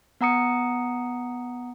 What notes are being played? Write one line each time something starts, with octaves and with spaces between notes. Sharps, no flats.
B3 F#5 A#5 D#6 C#7